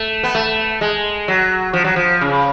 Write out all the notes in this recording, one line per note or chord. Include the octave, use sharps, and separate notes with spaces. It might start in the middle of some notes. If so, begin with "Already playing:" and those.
Already playing: A3
B3
A3
G#3
F#3
F3
F#3
F3
C#3